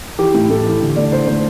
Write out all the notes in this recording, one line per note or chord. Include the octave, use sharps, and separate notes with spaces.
E3 G4
A2
A2 A4
E3
D3
A3 D5
D3 C5
A3 C5